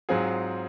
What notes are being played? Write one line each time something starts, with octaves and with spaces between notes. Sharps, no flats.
G#2 F#3 C4 F4 G#4